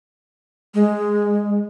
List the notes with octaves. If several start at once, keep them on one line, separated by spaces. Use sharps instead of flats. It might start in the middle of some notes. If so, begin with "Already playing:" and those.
G#3